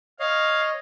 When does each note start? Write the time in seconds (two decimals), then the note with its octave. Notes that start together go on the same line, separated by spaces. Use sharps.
0.20 C#5 D#5 F5